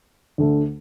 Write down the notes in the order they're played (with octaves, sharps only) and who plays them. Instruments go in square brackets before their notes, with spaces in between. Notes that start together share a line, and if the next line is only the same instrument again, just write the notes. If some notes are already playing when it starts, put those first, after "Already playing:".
[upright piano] D2 D3 A3